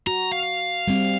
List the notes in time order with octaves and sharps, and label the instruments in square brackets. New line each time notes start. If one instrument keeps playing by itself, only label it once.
[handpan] F#4 [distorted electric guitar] A#5
[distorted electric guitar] F5
[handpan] G3 C4